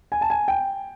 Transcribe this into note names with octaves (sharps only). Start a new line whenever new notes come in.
G#5
A5
G#5
G5